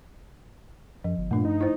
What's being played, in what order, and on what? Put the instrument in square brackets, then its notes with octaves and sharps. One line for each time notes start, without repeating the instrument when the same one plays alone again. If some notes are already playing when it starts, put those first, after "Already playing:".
[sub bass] F#2 [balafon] F3
[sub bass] G1
[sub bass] G2 [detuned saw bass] A#2 [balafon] A3 D4
[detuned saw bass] D#4
[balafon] E4 C5